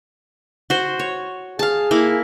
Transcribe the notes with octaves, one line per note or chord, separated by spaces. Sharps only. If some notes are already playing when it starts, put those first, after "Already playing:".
F#4 C5
C#5
G#4 F5 A5
A#3 E4